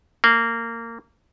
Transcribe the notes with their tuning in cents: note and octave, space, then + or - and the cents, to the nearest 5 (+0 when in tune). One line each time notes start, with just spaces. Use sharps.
A#3 -20